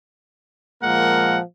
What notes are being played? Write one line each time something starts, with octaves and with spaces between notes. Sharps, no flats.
A#2 F3 G#3 A#3 A#4 F#5